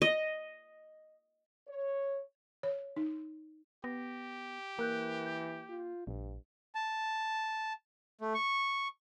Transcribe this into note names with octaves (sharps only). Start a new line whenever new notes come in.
D#5
C#5
C#5
D#4
B3 G4 A#6
E3 A#3 A#4 F#6 G6
G6
F4
A#1 G2
A5
A3
C#6